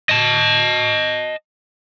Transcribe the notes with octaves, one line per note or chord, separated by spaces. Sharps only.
D#5 A5